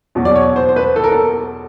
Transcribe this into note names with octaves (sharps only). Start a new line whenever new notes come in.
E2 B2 F#3
D5
C#5
C5
C5
B4
A4
A#4
A4